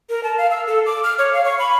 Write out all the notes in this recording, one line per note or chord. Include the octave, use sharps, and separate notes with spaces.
A#4
A5
F5
E6
A4
D6
F6
C#5
F5
C#6
B5